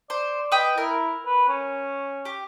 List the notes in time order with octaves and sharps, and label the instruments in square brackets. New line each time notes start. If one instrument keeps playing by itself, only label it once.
[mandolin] C5 [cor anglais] D5
[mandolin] B4 D#5 G5
[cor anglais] E4 [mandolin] A#4
[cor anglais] B4
C#4
[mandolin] G4